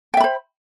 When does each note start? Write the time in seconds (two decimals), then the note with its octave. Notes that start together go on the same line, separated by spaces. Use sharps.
0.14 G5
0.17 E5
0.20 B5
0.24 C5